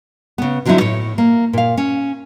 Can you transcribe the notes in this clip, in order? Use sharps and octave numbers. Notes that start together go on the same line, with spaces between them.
C#3 B3
D3 F3 F#3 C4 D#4 E4
A2 C#5
A#3
A#2 F5
C#4